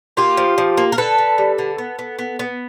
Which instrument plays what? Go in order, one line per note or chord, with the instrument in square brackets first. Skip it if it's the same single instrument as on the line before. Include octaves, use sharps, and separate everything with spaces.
[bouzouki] A#3 F4 G4
F3
F3
A#3
A#4
D3 A4 B4
D3
G3
D3
B3
B3
B3
B3